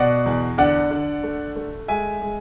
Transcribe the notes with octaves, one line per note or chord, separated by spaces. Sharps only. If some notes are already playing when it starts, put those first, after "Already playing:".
Already playing: B2 D5 F#5
E2
D3 D5 F#5
D3
A3
A3
G#3 E5 G#5
G#3